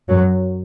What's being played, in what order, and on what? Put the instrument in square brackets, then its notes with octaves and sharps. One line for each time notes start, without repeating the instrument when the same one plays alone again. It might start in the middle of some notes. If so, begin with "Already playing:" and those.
[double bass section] F#2 F#3